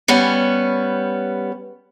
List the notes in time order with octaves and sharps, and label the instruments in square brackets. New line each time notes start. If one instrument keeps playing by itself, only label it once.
[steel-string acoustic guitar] G3 B3 C#4